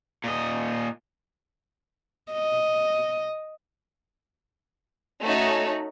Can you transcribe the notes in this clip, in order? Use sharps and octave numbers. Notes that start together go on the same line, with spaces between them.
A#2 D#5
D#5
A3 C#4 D#4 F#4 C#5